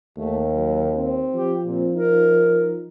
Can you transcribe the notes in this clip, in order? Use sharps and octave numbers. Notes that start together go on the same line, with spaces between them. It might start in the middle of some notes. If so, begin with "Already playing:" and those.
D#2 A3
F#3
C4
F3 G4
A#2 C4
D#4 A#4